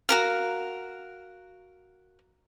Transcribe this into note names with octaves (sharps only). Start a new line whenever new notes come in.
F#4 A#4 F5